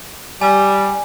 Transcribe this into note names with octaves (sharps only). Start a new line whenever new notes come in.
G3 G#5